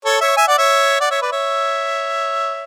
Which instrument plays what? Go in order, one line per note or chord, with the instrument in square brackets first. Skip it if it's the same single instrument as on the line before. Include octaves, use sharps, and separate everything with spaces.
[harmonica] A4 C#5
C#5 E5
E5 G#5
D5 F#5
C#5 E5
D5 F#5
C#5 E5
B4 D5
C#5 E5